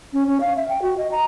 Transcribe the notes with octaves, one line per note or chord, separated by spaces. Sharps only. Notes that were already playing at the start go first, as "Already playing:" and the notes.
C#4
C#4
F5
E5
G5
F#4
D#5
A#5